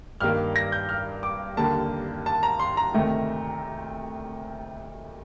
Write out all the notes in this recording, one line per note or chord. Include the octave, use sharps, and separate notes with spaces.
G2 D#3 G3 A#3 F6
A#6
G6
F6
D6
D#2 D3 G3 A#3 A5
A5
A#5
C6
A#5
D2 C3 D#3 A3